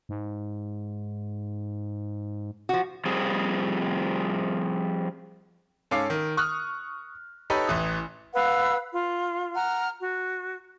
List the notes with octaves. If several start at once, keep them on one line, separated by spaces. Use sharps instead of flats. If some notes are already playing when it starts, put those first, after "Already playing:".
G#2
F3 F#4
F3 G3 C4 F4 G#4
G#2 C#4 A4 F5 D6
D#3
C#6 D#6 F6 F#6
D#4 G4 A4 B4 C#5
A1 E3 D#6
B4 F5 F#5 E6
F4
F#5 A#5 F6
F#4